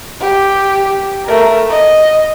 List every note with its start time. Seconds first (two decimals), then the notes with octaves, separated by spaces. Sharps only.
0.21 G4
1.25 A3 A#4
1.69 D#5